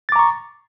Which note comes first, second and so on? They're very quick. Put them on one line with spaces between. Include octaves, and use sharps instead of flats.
A6 D6 A#5 C#6